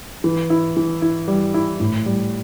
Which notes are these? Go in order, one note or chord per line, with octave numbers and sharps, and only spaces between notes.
E3
E4
E3
E4
G3
E4
A2
G3